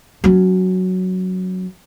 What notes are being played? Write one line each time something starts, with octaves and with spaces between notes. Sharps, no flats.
F#3 C#4